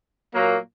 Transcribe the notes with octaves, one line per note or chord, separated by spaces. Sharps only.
A#2 F#3 A#3